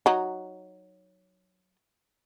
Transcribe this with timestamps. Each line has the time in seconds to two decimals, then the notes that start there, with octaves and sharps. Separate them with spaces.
0.06 F#3 D#4